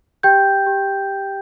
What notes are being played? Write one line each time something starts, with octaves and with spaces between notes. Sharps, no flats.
G4 G5 G6
G4